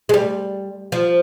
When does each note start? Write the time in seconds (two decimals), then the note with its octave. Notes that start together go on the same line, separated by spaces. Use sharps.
0.09 G#3
0.14 G3
0.92 F3